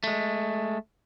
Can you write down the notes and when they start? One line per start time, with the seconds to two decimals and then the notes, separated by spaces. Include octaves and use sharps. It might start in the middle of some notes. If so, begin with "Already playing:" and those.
0.04 G#3 A3